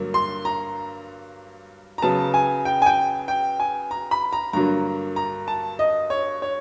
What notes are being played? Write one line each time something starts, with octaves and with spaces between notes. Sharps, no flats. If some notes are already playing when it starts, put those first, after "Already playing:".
Already playing: G2 D3 F#3 A#3
C6
A#5
A#5
C#3 F#3 B3 A5
G#5
G5
G#5
G5
G5
G#5
A#5
B5
A#5
G2 D3 F#3 A#3 A#5
A#5
A5
D#5
C#5
C#5